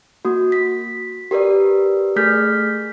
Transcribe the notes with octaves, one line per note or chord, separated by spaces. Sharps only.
A#3 F#4
B6
G4 A#4 B4 D5
A3 G#4 F6 G6 B6